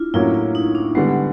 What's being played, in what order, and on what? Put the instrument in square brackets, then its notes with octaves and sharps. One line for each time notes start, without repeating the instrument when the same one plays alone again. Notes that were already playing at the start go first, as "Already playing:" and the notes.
Already playing: [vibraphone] D4 E4 F4
[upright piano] A2 F#3 A#3 C#4 [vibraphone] E4
[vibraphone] E4
D#4
D4
[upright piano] D3 G3 B3 [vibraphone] G#3